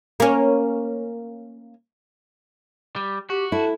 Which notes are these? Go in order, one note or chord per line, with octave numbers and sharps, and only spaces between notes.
A#3 C#4
G3
F#4 G4
E4 A4 A5